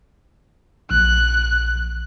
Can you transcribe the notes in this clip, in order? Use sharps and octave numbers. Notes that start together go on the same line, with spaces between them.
A#1 F#6